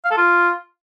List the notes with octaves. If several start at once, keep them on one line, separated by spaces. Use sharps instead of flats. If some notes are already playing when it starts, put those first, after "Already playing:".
F5
A4
F4